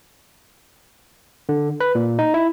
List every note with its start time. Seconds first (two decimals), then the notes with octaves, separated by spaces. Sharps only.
1.49 D3
1.80 B4
1.95 A#2
2.19 D#4
2.34 E4